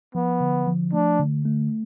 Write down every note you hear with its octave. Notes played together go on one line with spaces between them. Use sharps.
F3 B3
D3
F3
A3 D4
D3
A3